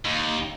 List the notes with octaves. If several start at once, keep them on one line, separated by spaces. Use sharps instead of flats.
D#2